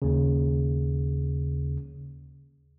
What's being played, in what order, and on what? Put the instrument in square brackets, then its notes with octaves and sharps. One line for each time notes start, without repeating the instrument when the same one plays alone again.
[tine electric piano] D#2 C#3